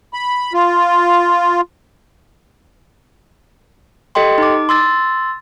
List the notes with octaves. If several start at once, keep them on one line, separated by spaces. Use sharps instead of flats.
B5
F4
G4 A4 D#5 G5 C6
D#4 D6
C6 E6 A6